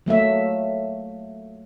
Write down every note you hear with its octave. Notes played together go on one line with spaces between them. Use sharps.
F#3 A3 A#3 E5